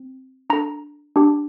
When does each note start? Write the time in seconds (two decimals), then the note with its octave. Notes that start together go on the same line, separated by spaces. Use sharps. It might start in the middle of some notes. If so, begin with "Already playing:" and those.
Already playing: C4
0.50 D4 A4 A#5
1.16 D4 G4